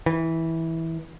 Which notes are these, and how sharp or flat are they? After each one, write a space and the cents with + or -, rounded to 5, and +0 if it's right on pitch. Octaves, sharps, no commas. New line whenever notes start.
E3 -15